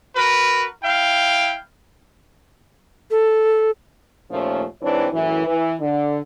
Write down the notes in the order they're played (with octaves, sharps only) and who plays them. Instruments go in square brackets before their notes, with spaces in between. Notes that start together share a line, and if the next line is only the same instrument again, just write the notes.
[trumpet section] F#4 A#4 B4
E4 F5 G5
[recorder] A4
[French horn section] D#2 A#2 F3 A3 C#4
G#2 E3 C4 D4 C#5
F#2 A2 E3
E3
D3